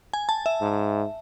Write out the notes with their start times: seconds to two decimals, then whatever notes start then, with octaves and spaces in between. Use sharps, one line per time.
0.13 G#5
0.29 A5
0.46 E5
0.61 G#2